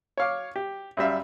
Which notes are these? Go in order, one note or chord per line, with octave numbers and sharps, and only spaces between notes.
C#5 F5 D6
G4
F#2 G3 E5 F5